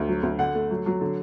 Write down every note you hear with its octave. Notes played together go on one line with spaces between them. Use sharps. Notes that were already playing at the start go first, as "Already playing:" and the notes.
Already playing: D2
F#3
D2
D3 F#5
A3
F#3
F#3
D3